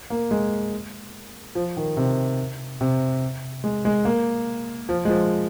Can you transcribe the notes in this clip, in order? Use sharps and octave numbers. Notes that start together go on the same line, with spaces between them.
A#3
G#3
F3
D#3
C3
C3
G#3
G#3
A#3
F3
G#3
F3